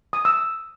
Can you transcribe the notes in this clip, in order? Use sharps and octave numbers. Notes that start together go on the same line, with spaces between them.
D#6
E6